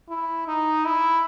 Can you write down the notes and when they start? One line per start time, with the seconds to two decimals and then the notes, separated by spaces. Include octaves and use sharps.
0.09 E4
0.48 D#4
0.85 E4